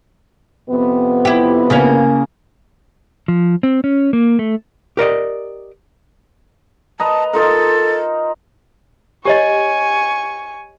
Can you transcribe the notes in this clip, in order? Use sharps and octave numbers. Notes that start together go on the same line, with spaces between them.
F2 C3 B3
E4 G4
C#3 A#3 C#4
F3
C4
C#4
A#3
A3
G4 A#4 D5 D#5
B4 D#5 A5 A#5
D#4 F4 A4 A#4
G4 C#5 D#5 G#5 C#6